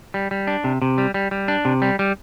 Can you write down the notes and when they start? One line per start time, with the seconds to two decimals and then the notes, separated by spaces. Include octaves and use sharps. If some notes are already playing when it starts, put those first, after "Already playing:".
0.14 G3
0.31 G3
0.47 D4
0.64 C3
0.82 C3
0.98 G3
1.14 G3
1.31 G3
1.48 D4
1.65 C3
1.82 G3
1.99 G3